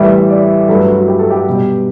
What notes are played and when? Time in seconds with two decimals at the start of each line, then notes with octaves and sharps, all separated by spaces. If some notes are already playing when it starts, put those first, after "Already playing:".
Already playing: A2 E3 G3 E5
0.30 D5
0.68 G2 F#3 A3 B4
0.88 F#4
1.08 G4
1.19 A4
1.31 G4
1.47 B2 G3